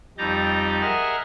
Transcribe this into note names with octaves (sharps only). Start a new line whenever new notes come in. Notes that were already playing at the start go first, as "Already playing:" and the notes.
F2 G3 D#4 A#5 G6 A6
G#4 A#4 D#5 E5 F#5 F6